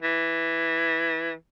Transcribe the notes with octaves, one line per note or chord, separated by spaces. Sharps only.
E3